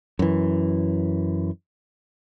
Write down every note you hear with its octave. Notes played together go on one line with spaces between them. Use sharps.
F#2 E3